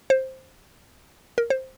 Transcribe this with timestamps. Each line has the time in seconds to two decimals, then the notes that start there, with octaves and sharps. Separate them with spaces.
0.10 C5
1.38 A#4
1.50 C5